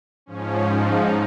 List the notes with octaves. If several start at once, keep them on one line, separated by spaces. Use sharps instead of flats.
G#2 F3 C#4
D#4